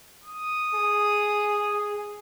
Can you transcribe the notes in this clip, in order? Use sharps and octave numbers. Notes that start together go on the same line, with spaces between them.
D#6
G#4